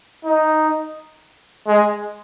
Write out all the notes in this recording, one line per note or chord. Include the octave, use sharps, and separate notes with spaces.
D#4
G#3